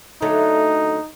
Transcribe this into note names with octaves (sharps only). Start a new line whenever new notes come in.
D3 F#3 A3 D#4